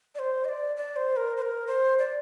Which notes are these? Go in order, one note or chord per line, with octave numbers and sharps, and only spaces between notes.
D5
C5
D#5
D5
D5
C5
A#4
C5
A#4
C5
D5